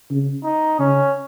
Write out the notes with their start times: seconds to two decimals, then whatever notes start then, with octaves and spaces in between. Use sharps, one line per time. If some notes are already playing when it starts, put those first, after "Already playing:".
0.11 C#3
0.44 D#4
0.79 C#3 C#4